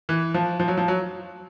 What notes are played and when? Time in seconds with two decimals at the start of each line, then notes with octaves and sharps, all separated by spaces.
0.09 E3
0.34 F3
0.60 F3
0.68 F#3
0.77 F3
0.88 F#3